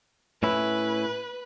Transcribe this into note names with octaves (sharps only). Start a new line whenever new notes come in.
A2 C#4 E4 B4